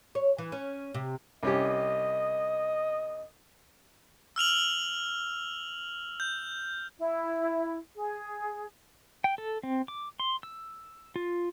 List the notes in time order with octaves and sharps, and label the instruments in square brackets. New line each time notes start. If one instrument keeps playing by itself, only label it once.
[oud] C#5
E3
C#4
C3
[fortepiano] C2 C#4 G4 [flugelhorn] D#5
[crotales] E6 F6 F7 F#7
G6
[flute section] E4
G#4
[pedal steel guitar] G5
A4
C4
D6
C6
E6
F4